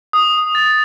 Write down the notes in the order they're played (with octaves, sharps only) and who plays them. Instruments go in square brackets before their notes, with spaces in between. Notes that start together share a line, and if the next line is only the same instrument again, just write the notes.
[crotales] D#6
A6